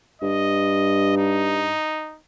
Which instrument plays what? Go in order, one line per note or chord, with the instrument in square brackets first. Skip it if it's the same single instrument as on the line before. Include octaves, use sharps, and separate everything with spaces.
[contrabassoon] G2 [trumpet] D#5
[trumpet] D#4